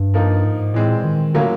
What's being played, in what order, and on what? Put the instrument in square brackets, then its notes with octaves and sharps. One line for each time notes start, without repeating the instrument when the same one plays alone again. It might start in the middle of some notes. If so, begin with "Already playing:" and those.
Already playing: [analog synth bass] G2
[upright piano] F3 A#3 D#4
[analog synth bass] G#2
[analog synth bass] A2 [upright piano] E3 G#3 C4
[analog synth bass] A#2
D#3
[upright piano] A2 F#3 A#3 C#4 F4 [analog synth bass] D3